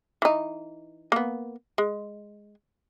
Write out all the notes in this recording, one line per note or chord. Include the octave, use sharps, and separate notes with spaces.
E3 D#4
A#3 B3
G#3